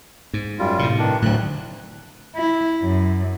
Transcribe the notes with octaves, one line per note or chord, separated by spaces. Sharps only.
G#2
F#2 G3 F4
A2 C3
G2 D#3 D4
D2 A2 D3 F#3 F#6
E4
F#2